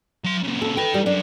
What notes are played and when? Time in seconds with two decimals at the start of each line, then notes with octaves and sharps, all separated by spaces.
0.24 F#3 C6
0.44 A#2 C#3
0.62 A4
0.77 D#4 B4 G5
0.94 G3
1.06 F#2 D4